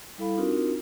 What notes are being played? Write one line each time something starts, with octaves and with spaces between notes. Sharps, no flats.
G3 E4 A4 F5 B5
C4 D4 D#4 F4 F#4 A#4